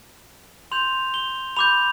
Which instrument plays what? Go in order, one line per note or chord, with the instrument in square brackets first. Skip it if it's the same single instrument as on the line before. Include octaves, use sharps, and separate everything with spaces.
[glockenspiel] C6 G6 F7
G7
B5 D6 G6 F7